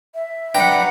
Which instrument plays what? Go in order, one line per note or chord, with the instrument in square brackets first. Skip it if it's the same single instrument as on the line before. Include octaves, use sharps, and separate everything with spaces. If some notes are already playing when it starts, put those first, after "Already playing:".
[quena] E5
[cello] F#3 F#5 [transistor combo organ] D4 B4 A#5 [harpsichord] G5